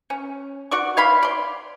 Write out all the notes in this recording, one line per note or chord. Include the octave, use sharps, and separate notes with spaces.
C#4
F#4 D5 C#6
C#5 F5 B5 C6
D5 C6